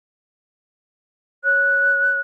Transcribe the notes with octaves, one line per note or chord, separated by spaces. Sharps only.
C#5 F#6